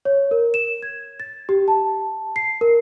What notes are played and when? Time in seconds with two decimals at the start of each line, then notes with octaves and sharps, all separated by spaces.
0.05 C#5
0.31 A#4
0.54 E7
0.82 G#6
1.20 A6
1.49 G4
1.68 A5
2.36 C7
2.61 A#4